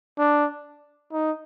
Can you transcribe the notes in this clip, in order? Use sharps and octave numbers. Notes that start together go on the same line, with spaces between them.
D4
D#4